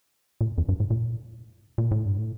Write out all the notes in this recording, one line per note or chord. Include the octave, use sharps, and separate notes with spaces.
A#2
A2
F2
G2
A2
A#2
A#2
A2
G2
A2